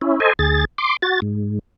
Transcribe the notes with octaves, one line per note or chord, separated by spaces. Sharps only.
C#4 E4
A4 C5 D#5 G#5
D2 G#4 A6
C6 D6
F#4 A6
G#2